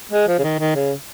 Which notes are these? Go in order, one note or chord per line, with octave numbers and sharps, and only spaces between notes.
G#3
F3
C#3
D#3
D#3
C#3